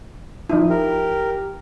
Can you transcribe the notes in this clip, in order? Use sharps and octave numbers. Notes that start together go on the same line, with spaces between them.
F3 D#4 E4
G4 A#4